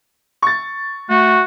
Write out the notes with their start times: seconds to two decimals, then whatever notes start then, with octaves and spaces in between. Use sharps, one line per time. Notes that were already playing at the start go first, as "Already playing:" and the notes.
0.42 C#6 A6
1.10 A3 F#4